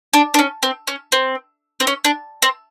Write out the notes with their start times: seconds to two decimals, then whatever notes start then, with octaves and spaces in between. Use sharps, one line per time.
0.13 D4
0.34 D4
0.39 C#4
0.63 C4
0.87 C#4
1.12 C4
1.80 C4
1.87 C#4
2.05 D4
2.42 C4